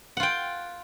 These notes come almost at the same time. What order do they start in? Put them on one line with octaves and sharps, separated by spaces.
F#5 F4 G5